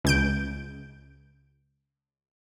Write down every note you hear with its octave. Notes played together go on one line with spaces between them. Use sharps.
C#2 G6 D7